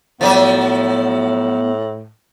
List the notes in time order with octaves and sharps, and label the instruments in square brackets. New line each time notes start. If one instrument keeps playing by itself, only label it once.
[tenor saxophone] A2 [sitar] F3 F#3 E5 [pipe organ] B3